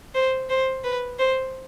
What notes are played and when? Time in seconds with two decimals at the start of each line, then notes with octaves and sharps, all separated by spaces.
0.14 C5
0.50 C5
0.84 B4
1.19 C5